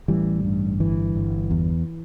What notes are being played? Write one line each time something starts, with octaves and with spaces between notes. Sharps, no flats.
A1 E3 G3
G2
G1 E3
G1
E2